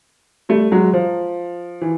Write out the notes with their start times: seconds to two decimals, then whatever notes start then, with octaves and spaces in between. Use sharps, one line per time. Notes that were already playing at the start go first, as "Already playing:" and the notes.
0.49 G3 A3
0.72 F#3 G#3
0.93 F3
1.81 E3